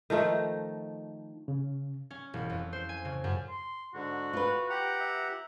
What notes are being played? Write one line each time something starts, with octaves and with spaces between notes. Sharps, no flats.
D#3 F3 A3 D#4
C#3
C#4
E1
F2
C5
G#5
C#3
F#2
C6
G#2 D3 F#4
F4 B4
G4 F#5 G5 A#5
E5